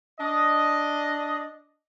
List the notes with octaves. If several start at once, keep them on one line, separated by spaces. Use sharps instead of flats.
D4 D#5